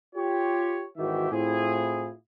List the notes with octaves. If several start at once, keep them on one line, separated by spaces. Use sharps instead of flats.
F4 G4 C#5
G#1 D#3 E3 F#4 G4 E5
A2 C4 E4 F4 G#4